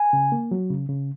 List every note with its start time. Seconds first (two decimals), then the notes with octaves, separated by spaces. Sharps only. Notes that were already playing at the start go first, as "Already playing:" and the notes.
Already playing: G#5
0.13 C#3
0.32 A#3
0.51 F#3
0.70 C#3
0.89 C#3